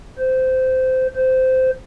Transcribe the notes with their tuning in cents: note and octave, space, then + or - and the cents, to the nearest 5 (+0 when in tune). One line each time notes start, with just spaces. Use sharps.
C5 -15
C5 -15